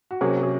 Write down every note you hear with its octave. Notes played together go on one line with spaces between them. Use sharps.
F#4
C3 F#3 A#3 C#4 G#4
G#4